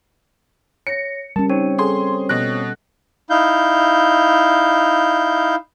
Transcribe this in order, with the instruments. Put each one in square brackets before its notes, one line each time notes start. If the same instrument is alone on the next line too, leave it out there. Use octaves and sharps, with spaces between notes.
[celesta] C#5 A#6 [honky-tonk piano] C#7
[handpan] G3 C#4 [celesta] A#4 [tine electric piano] A5
[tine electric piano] C4 C#5 [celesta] D#4 D#7
[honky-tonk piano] G#4 C6 [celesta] A4 C5
[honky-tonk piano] B2 F#6 [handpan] A4 [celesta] D#5 A#6
[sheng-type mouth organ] D#4 E4 F5 G6